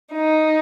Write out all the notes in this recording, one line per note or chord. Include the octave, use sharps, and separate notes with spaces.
D#4